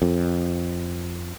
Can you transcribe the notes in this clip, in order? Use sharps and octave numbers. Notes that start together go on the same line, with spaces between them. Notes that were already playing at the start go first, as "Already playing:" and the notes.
F2